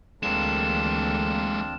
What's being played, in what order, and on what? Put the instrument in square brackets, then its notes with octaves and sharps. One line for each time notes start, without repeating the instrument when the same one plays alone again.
[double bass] D2 E3 [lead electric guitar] G#3 A#3 [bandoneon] C4 D4 F4 [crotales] E7